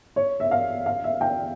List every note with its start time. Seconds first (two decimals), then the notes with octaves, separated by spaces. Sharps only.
0.16 C#5
0.40 E5
0.51 F5
0.86 F5
1.04 E5
1.21 G5